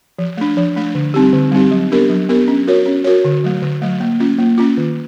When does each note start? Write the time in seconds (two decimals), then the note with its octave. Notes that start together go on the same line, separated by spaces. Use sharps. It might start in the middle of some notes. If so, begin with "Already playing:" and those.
0.19 F3
0.37 A3 D4
0.57 F3
0.76 A3 D4
0.95 D3
1.14 G3 C4 D#4 G4
1.33 D3
1.52 G3 C4 D#4 G4
1.71 F#3
1.91 B3 D4 G4 A#4
2.10 F#3
2.29 B3 D4 G4 A#4
2.48 C#4
2.67 F#4 A#4 C#5
2.86 C#4
3.04 F#4 A#4 C#5
3.25 D3
3.44 F#3 A3
3.62 D3
3.82 F#3 A3
4.00 A#3
4.20 C#4 F4
4.38 A#3
4.58 C#4 F4
4.77 D#3